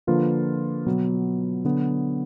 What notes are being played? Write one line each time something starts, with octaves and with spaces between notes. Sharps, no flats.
D3 F3 A#3 F4 B4
B2 F#3 B3
D3 F#3 B3